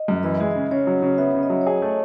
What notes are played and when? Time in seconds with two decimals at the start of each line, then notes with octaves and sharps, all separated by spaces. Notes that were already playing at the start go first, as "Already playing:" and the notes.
Already playing: D#5
0.08 F#2
0.23 E3 D#5
0.37 G#3 E5
0.51 C#3 D#5
0.71 C#3 C#5
0.87 F#3
1.02 C#3
1.18 B3 E5
1.34 C#3
1.43 D#5
1.50 F#3
1.61 C#5
1.66 G#4 D#5
1.82 A3